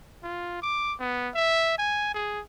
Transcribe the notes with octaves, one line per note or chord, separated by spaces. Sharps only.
F4
D6
B3
E5
G#5
G#4